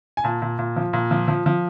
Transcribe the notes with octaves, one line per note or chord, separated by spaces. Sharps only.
G#5
A#2 A5
A#2
A#2
F3
A#2
F3
F3
F3